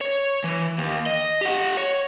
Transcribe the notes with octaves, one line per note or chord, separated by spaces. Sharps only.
C#5
E3
D#2
D#5
G4 F#5
C#5